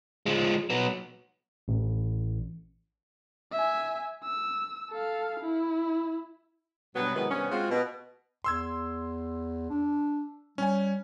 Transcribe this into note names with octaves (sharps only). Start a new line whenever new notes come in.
F3 G#3
F#3 B3
A1
E5 G#5
E6
A4 F5
E4
G2 B2 F#3 B3
C3 D#3 E3 F#3 G#3 B3
G2 C3 B3 C#4
G#3 C4 F4 F#4
B2
E2 C6 E6 G#6
D4
G3 C#4 G#5